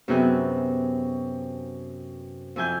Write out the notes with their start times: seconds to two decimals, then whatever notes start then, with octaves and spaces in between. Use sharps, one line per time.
0.08 F#2 C3 B3 G#4 G5 F#6
2.56 F2 E4 G#5 G6